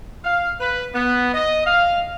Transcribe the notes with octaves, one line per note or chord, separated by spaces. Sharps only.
F5
B4
B3
D#5
F5